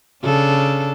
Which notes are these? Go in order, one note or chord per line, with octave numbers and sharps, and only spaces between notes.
C#3 D4 A4